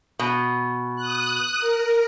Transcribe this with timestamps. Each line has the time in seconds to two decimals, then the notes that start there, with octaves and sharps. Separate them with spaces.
0.19 B2
0.96 D#6 F#6
1.58 A#4